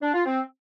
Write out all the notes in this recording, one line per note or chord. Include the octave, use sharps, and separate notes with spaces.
D4
F4
C4